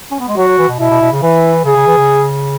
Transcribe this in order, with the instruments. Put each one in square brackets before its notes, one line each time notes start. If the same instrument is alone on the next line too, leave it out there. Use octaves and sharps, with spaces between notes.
[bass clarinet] C#4
B3
G#3
[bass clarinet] F#3 [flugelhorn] F#4
[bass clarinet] F#3
E3
B2
[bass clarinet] B2 [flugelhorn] E4
[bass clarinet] B2
B2
C#3
[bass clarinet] E3 [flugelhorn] E4
[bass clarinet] C#3 [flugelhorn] G#4
[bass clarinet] C#3
E3
C#3